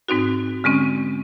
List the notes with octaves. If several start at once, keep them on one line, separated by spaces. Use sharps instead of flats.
G#2 C4 D#4 F#4
D3 G#3 C4 C#4